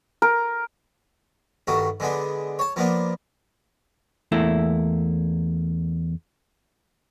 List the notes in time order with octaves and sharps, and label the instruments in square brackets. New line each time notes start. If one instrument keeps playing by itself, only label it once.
[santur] A#4
[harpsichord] G2 D#3 A3 F#4
D3 G#3 B3 D4
C#5 A5
F3 A#3 B3 D4
[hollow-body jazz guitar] E2 A3 A#3 E4